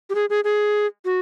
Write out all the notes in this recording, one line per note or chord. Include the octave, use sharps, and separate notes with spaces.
G4
G#4
G#4
G#4
F#4